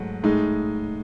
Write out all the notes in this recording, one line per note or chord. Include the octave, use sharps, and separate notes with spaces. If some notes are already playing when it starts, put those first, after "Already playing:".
Already playing: G#2 F#3 A3
A2 G#3 D#4